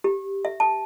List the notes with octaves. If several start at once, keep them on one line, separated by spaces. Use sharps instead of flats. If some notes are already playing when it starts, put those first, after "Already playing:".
G4
E5
A5